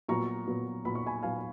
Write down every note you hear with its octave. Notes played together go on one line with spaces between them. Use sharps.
A#2 F#3 B3 A#5 C#6
A#2 F#3 B3
A#2 F#3 B3 B5
C#6
G#5 B5
A#2 F#3 B3 F5 G#5